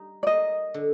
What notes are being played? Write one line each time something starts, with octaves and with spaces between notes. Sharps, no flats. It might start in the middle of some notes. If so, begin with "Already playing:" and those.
Already playing: G3 D#4
D5
A#3 D#5
D3